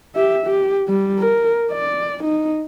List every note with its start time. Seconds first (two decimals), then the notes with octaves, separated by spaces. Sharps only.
0.16 G4 E5
0.46 G4
0.88 G3
1.19 A#4
1.72 D5
2.24 D#4